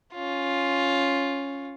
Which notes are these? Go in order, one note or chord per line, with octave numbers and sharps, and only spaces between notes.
C#4 F4